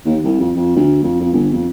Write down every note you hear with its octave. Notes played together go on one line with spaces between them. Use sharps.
D#2
C2
F2
F2
D2
F2
F2
G1
F2